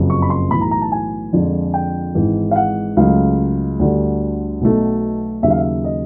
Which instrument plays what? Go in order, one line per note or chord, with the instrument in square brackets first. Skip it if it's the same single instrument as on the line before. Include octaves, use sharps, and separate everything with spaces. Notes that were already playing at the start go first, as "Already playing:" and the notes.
Already playing: [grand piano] F#1 F2 C#3 F#3
C#6
B5
C6
B1 A2 E3 B5
A#5
A#5
A5
G#5
F2 D3 F3 G#3
G5
G#1 G#2 E3 G#3
F5
F#5
C#2 C#3 F#3 A3 F5
D2 D3 G3
B1 B2 F#3 A3
D#2 C#3 F#3 E5
F5
E5
D#5